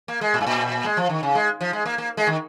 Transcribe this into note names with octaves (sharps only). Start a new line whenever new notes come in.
A#3
G#3
A#2
G#2
A#2
G#3
F3
D#3
C#3
G#3
F3
G#3
A#3
A#3
G#3
D#3